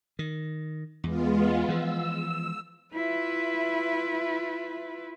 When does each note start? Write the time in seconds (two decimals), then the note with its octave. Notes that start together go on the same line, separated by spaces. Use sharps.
0.19 D#3
1.04 E2 G#3 B3 F4
1.68 E3 F3 E6
2.94 E4 F4 B4 E5